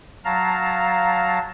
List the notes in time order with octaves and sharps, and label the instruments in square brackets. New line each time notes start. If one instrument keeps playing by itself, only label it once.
[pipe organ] F#3 F5 A5 A#5